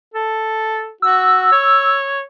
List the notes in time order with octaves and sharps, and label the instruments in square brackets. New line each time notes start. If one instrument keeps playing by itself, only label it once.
[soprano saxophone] A4
[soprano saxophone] F#4 [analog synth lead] E6
[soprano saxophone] C#5